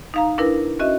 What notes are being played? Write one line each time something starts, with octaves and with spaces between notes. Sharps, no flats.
D#4 F5 A#5
D4 E4 A#4 B4
C#4 F#4 D#5 E5